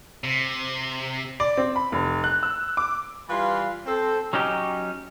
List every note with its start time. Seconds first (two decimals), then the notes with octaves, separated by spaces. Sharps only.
0.24 C3
1.40 D5
1.57 C4
1.76 B5
1.92 F1
2.24 F#6
2.43 E6
2.77 D6
3.29 E3 G3 F4 B4 F5 C6
3.86 C4 A4 C5
4.33 F#3 C#4 D#4 G4